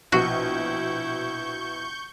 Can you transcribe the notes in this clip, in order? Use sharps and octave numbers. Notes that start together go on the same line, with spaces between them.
A#1 B2 E4 F#4 C#6 G6